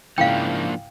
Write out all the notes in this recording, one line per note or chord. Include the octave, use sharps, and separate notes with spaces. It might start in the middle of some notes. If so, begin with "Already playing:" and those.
G#2 C#3 F3 A#3 D4 E4 F5 G5